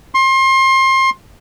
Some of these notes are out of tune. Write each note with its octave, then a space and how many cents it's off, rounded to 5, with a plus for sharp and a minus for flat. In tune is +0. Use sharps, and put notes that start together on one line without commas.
C6 +30